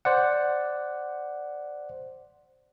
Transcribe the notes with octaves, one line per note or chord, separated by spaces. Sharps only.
C5 D5 F#5